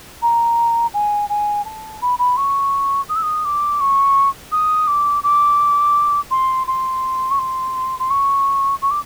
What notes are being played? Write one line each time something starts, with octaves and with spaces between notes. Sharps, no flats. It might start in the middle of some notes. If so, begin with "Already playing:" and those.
A#5
G#5
G#5
A5
B5
B5
C#6
D#6
E6
D#6
D6
C#6
D#6
D6
D6
C6
C6
C#6
C6
C6
C#6
C#6
D6